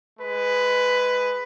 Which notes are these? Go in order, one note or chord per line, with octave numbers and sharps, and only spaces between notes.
G#3 B4